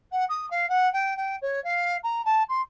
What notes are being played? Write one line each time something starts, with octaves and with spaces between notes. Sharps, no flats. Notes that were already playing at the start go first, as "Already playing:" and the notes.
F#5
D#6
F5
F#5
G5
G5
C#5
F5
A#5
A5
C6